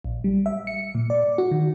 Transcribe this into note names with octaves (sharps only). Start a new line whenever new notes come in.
A#1
G3
E5
C#7
A#2
D5
F#4
D#3